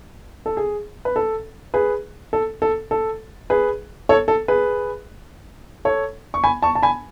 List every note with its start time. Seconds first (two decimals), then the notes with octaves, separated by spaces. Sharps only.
0.46 A4
0.57 G#4
1.05 B4
1.16 A4
1.74 G#4 B4
2.33 A4
2.62 A4
2.91 A4
3.50 G#4 B4
4.09 A4 C#5
4.28 A4
4.48 G#4 B4
5.85 A4 C#5
6.34 C#6
6.44 G#5 B5
6.62 A5 C#6
6.75 A5
6.83 G#5 B5